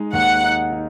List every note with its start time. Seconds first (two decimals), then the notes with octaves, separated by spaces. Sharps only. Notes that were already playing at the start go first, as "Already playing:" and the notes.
Already playing: G#3 D#4
0.13 D#2 F#5
0.43 D#4
0.72 D#4